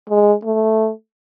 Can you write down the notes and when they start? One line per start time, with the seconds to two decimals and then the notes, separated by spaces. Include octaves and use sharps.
0.10 G#3
0.44 A3